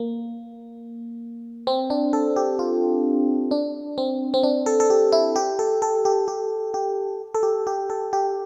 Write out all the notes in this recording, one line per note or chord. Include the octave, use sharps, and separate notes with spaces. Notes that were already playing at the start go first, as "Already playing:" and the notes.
Already playing: A#3
C4
D4
A4
G4
F4
D4
C4
C4
D4
A4
A4
G4
E4
G4
A4
A4
G4
G4
G4
A4
G4
G4
A4
G4